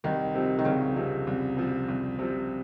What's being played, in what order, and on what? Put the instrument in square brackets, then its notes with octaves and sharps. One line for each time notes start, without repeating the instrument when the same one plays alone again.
[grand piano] C2 [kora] D#3
[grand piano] C3 F3
[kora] D#3
[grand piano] C2 [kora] C#3
[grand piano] C3 F3
C2
C3 F3
C2
C3 F3